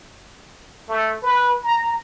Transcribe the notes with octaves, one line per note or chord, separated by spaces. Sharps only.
A3
B4
A#5